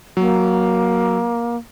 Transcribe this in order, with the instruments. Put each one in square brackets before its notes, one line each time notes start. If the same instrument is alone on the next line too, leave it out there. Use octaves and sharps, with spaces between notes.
[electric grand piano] F#3 [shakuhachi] A#3